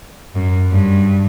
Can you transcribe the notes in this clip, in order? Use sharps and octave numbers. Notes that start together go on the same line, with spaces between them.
F#2
G2